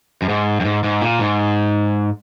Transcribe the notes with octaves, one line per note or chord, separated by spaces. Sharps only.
F#2
G#2
F#2
G#2
G#2
A#2
G#2